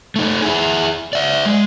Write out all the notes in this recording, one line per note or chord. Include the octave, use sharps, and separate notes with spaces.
A3 D#4
E4 G#4
D5 E5
G#3